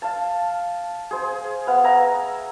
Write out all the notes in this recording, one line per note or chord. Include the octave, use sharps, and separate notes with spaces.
F5 A5
G#4 C5
B3 F5
E5 G#5 A#5 B5